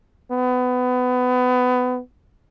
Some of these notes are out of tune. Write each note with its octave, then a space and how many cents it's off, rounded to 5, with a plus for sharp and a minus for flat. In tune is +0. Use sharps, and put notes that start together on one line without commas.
B3 +25